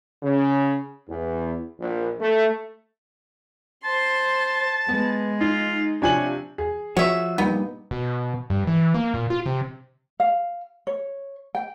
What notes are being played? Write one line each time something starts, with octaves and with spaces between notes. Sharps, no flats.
C#3
E2
A#1
A3
C5 A5 C6
G#3 B3
D#4 F4
C3 F3 D4 C#5 G#5 F#7
G#4
F3 F#4 C#5 E5
G2 A#2 B3 D#4
B2
G2
E3
A#3
A#2
F4
C3
F5
C#5
G5